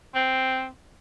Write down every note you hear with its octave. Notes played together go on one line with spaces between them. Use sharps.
C4